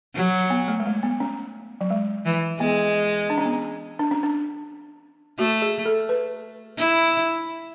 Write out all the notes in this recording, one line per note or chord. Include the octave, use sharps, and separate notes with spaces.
F#3
B3
A3
G#3
A3
B3
C#4
F#3
G#3
E3
G#3 B3
D4
C#4
B3
C#4
D4
C#4
D4
A3 F#4
G#4
A4
B4
E4